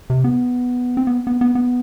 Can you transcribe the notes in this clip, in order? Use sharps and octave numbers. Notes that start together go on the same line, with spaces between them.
C3
B3
C4
B3
B3
B3
B3